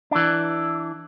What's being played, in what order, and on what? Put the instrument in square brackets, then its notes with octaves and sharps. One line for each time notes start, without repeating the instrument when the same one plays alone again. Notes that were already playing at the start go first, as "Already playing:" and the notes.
[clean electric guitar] E3 D4